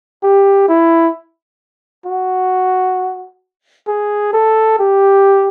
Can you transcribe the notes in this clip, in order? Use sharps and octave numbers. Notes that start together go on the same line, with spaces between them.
G4
E4
F#4
G#4
A4
G4